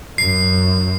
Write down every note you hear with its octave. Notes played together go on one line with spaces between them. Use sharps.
F#2 C7